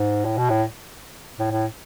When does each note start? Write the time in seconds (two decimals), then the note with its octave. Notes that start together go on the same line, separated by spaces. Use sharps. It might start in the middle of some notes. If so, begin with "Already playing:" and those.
Already playing: G#2
0.25 A2
0.38 B2
0.50 A2
1.39 A2
1.52 A2